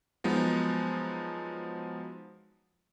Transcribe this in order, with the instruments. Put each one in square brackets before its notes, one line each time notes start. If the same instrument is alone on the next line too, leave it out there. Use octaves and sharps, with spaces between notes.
[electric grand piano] F3 F#3 G#3 B3 D#4